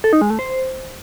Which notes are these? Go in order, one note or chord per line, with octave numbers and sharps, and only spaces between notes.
A4
D#4
G#3
A3
C5